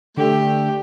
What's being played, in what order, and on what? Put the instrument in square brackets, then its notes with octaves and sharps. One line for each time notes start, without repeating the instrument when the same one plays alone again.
[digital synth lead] D3 [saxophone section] A3 [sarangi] G4